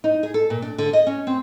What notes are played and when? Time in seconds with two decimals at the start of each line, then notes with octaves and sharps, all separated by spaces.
0.04 D#4
0.23 G#4
0.34 A4
0.50 A#2
0.62 D4
0.78 D3
0.93 D#5
1.07 C#4
1.27 C4